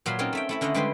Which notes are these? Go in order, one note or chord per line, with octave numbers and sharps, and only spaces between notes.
A#2 F#3 F5 B5 C6
C4 C#4 D#4 F4 A#4 C#5
A3 E5 G5
A3 E4 E5
D3 C#4 E4 C5 D#5 F#5
D3 G3 G#3 B4 C5 G5